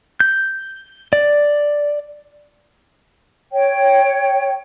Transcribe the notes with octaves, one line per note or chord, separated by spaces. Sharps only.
G6
D5
C#5 G5